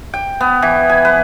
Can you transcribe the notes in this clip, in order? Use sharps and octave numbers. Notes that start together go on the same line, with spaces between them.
G5
B3
E3
G#5
B4